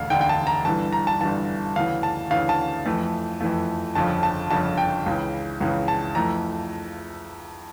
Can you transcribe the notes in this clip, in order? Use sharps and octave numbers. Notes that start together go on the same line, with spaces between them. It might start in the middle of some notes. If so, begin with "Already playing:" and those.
Already playing: E1 D2 D3 F5
E1 D2 D3 G5
G5
A5
A#5
G1 G2 E3 A5
A#5
A5
G1 G2 E3 A5
D2 C#3 E3 F5
A5
D2 C#3 E3 F5
A5
F2 E3 A3
F2 E3 A3
G1 F2 C#3 F3 A5
A5
G1 F2 C#3 F3 A5
G5
C#2 C#3 E3
C#2 C#3 E3
A5
F2 E3 A3 A#5